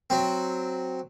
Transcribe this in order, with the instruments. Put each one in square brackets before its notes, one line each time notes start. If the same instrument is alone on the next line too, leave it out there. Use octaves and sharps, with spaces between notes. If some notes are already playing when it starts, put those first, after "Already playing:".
[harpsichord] F#3 C4